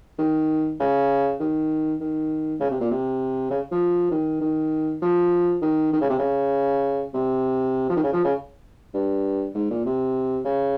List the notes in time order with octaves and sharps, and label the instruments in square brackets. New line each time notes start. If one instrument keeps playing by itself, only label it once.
[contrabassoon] D#3
C#3
D#3
D#3
C#3
C3
A#2
C3
C#3
F3
D#3
D#3
F3
D#3
D#3
C#3
C3
C#3
C3
F3
D#3
C#3
F3
C#3
G2
G#2
A#2
C3
C#3